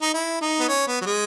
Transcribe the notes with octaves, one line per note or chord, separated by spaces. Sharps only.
D#4
E4
D#4
B3
C#4
B3
F#3
G#3